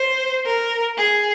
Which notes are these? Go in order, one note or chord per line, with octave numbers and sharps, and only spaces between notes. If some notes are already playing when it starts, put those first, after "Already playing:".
Already playing: C5
A#4
G#4